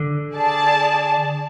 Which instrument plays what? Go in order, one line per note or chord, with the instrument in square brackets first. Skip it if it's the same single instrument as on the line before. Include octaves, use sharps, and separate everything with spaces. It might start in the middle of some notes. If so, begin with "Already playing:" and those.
Already playing: [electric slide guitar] D3
[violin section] G#4 D5 A5